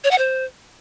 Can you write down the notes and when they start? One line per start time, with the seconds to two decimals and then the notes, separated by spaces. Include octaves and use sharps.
0.04 C#5
0.11 F#5
0.18 C5